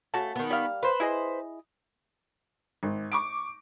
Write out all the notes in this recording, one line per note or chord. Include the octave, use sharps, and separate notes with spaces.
C#3 A3 F#4 A5
D#3 B3
G3 A#3 F5
B4 C5
E4 G#4 D#5
G#1
C#6 D6 D7